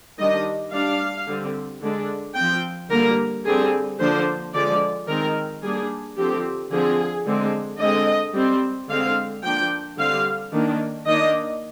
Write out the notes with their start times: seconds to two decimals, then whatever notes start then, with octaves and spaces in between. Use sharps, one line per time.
0.18 D#3 G3 D4 D#5
0.73 G3 D4 F5
1.27 D3 G3 C4
1.82 D3 G#3 D4
2.36 F3 C4 G5
2.90 D3 G3 A#3 A#4
3.45 D3 G3 C4 G#4
4.00 D3 F3 A#3 D4 C5
4.54 D3 F3 G#3 D5
5.08 D#3 G#3 C4 A#4
5.62 G3 A#3 D4 G#4
6.17 D3 F3 C4 G4
6.72 D3 F3 C4 G#4
7.26 D3 G#3 C4
7.80 D3 G#3 C4 D#5
8.34 G3 C4
8.89 D3 G#3 C4 F5
9.43 F3 A#3 D4 G5
9.98 D3 G3 C4 F5
10.53 D#3 A#3 D4
11.07 D#3 A#3 D4 D#5